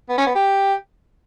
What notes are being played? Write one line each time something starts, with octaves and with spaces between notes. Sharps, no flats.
B3
C#4
B3
G4